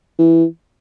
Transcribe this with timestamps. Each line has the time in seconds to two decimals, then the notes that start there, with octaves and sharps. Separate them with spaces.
0.19 E3